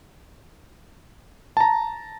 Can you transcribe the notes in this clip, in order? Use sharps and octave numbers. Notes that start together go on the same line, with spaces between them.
A5 A#5